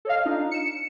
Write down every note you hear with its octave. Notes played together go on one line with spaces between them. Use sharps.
A4 C#5 D#5 F5
D4 D#4 F4
C#7 E7